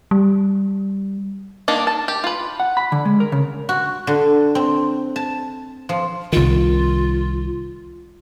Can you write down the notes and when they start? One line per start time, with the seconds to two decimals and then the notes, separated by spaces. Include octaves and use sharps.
0.11 G3
1.68 D#3 A#3 D4
1.87 A5
2.08 G4
2.24 F4 B4
2.60 F#5
2.77 B5
2.92 D3
3.05 G#3
3.20 A#4
3.32 C#3
3.69 F#4
4.07 D3
4.55 C4
5.16 A5
5.89 F3
6.33 C2 D#3 F4